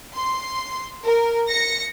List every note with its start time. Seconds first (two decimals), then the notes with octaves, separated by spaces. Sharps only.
0.15 C6
1.03 A#4
1.49 A#6 C#7